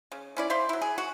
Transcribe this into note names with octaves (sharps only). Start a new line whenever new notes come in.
C#3
C#4 E4 D5
C5 E5 F5 C6
F#3 E4
G#4
F#4